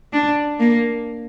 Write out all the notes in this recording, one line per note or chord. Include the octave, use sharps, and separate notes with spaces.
D4
A#3